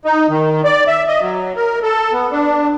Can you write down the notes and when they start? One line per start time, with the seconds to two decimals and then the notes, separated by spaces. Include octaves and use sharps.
0.05 D#4
0.29 D#3
0.64 D5
0.87 E5
1.08 D#5
1.21 F#3
1.56 A#4
1.83 A4
2.12 B3
2.32 D4